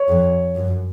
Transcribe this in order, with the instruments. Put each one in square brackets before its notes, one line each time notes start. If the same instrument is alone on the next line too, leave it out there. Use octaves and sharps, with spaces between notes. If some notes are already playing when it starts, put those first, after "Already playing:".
Already playing: [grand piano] C#5
[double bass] F2
F#2